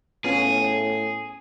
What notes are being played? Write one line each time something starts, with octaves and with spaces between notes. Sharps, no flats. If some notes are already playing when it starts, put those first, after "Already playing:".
A2 B3 C#4 F4 G#4